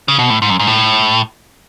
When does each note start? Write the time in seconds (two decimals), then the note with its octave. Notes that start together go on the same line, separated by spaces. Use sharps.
0.08 C#3
0.19 B2
0.30 A2
0.42 G#2
0.50 F#2
0.60 G#2
0.67 A2